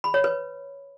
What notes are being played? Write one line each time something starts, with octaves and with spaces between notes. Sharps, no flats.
B5
C#5
B4